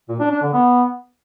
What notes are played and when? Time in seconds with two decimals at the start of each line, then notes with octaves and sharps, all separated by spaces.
0.09 A#2
0.20 D4
0.31 D4
0.42 D3
0.53 B3